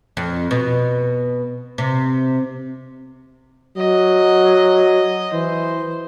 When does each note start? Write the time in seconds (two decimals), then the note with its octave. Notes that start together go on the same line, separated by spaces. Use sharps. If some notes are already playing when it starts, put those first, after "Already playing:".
0.17 F2
0.51 B2
1.78 C3
3.77 F#3 D#5
5.33 E3 C5